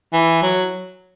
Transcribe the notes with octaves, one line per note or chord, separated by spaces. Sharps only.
E3
F#3